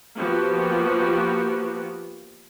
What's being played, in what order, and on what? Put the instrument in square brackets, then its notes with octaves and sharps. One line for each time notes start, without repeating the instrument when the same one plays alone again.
[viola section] F3 A#3 B3 F#4 G4